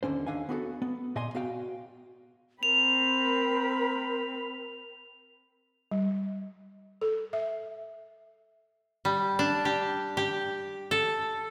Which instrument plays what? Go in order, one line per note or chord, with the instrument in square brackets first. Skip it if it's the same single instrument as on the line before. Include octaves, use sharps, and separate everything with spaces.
[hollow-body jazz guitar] D#2 D3 C#4 C5
D#2 D3 D4 F5 G#5
B3 F#4 G#4 A4
B3
A#2 D#5 G#5 C6
B3 F#4 F5 G5
[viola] C4 B5 [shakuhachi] A#4 [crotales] F7
[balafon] G3
A4
E5
[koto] G3
D4
G4
G4
A4